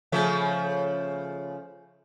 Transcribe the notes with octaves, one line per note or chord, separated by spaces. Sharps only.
C#3 F3 A3